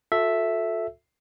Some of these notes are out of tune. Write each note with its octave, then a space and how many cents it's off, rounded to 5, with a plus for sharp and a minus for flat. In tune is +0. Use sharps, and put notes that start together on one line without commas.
F#4 -45 A4 +0 E5 +0